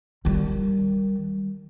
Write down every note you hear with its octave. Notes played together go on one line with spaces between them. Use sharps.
D#3 G3